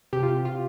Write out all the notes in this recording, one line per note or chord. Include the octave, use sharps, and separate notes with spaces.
C3 G4
F4
F4